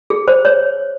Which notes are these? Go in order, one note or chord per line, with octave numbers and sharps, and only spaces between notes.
G#4
C5
C#5